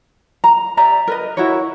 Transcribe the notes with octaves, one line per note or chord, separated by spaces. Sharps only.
A#5
G4 D5 E5 A#5
A#4 B4 D#5
E4 F#4 A#4 C#5